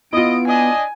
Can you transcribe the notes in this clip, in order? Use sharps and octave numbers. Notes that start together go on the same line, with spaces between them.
B3 E4 F4 D#5 D7
D4 D#5 G#5